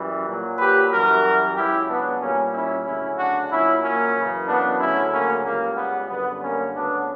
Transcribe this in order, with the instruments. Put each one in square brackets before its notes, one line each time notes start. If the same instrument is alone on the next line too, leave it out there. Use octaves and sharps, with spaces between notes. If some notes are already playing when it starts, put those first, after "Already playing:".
Already playing: [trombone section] F#2 E3 G3
A#2 F#3
G4 B4
F#2 E3 G3 F#4 A#4
C#2 C#3 F#3 E4 G4
B3 D4
A#2 G3 A#3 C#4
C#4 E4
D2 C#3 F#3 C#4 E4
D4 F#4
A#2 F#3 C#4 E4
A#3 C#4
F#2 C#3 E3
B3 D4
D2 C#3 F#3 C#4 E4
A#3 C#4
C#2 C#3 G3 A#3
B3
F#2 D3 G3 B3
A#3 C#4
D2 C#3 F#3 B3 D4